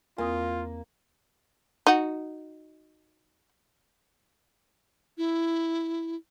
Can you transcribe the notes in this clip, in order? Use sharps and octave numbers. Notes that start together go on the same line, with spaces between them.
E2 A#3 C4 F4 D#6
D#4 F#4
E4